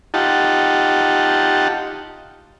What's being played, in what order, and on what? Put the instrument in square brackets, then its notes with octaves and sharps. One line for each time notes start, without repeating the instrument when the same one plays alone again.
[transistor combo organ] D#4 F4 G4 F#5 A5